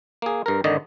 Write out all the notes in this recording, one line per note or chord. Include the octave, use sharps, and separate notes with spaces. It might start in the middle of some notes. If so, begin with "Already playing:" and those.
A#3 G#4
G2 A#4
G#1 D3 D#3 D5 D#5